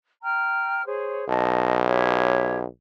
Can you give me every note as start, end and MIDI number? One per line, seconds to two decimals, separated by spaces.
0.23 0.86 79
0.23 0.86 82
0.23 0.86 89
0.86 1.25 68
0.86 1.25 72
0.86 1.25 73
1.29 2.65 35
1.29 1.77 75
1.29 1.77 81
1.86 2.58 67
1.86 2.58 73
1.86 2.58 76